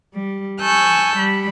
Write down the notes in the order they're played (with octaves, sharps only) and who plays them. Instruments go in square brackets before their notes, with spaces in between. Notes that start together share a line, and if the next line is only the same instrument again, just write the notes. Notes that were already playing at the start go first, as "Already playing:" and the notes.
[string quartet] G3
G#5 A5 C#6 E6 F#6 G6
G3 B5